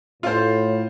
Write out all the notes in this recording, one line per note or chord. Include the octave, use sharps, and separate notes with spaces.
A2 F4 C5